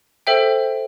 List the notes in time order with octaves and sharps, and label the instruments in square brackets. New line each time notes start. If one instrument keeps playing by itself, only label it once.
[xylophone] A4 C5 E5 G5